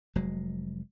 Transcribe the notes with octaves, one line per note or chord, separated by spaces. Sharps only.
F1 F#3 G#3